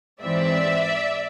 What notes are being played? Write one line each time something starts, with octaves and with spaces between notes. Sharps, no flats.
G#2 E3 G#3 C4 D5 E5